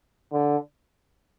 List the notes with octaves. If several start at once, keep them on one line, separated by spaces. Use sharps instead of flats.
D3